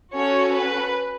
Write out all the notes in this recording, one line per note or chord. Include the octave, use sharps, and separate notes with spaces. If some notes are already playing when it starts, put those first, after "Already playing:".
C#4 F#4 A4 C#5
B4